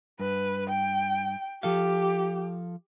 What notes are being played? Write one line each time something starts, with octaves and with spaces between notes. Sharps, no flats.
G2 B4
G5
F3 G4 A4 F5